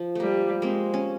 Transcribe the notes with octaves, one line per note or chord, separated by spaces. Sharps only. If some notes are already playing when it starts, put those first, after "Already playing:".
Already playing: F3
G3 A3 A#3
G#3 A#3 C4
C#4